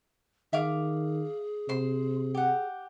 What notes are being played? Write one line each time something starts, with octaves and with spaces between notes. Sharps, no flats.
D#3 G#4 E5 F5 D6
C3 C5 C6
G4 F#5